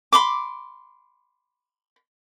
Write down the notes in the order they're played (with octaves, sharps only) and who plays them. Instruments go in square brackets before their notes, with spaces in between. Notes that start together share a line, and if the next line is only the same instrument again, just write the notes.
[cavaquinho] B5 C6 D6